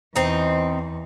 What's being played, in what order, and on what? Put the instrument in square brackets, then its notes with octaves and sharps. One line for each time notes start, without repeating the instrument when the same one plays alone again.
[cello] E2 [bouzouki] C4 D#4